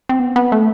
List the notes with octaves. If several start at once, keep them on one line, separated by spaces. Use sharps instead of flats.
C4
B3
B3
A3